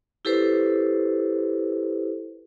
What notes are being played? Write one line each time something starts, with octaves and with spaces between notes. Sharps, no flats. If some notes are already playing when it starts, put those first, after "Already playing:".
E4 G4 A4 B4 C5